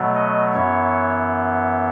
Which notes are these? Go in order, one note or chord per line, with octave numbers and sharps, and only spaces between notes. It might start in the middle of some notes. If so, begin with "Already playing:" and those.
Already playing: B2 F#3 A3
D#5
F#2 E3 B3 C#5